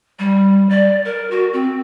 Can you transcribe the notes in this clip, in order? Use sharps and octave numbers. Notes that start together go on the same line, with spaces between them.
G3
D5
A#4
F#4
C4